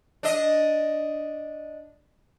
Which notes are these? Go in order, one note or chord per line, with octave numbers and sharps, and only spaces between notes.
D4 D#5